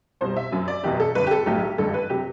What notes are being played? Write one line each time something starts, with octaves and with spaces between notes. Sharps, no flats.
C2 B2 G3 C5
E5
F#2 F#3
D5
F#1 E2 B2 G4
A4
G1 G2 D3 B4
G4
A4
B1 A2 F#3 G4
A1 G2 D3 A4
B4
C3 F#3 G4